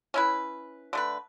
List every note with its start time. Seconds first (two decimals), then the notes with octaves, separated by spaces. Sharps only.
0.14 C#4 E4 B4
0.93 D3 A3 B4